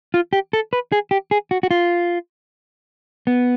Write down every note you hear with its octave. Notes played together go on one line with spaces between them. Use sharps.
F4
G4
A4
B4
G#4
G4
G#4
F#4
F#4
F4
B3